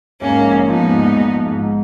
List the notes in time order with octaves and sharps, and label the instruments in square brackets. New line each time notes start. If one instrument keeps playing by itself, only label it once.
[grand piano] G#2 [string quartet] A#3 C#4
[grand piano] A#1
A#1
[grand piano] F3 [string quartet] B3 D#4
[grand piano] G#2
A#1
A#1
F3
G#2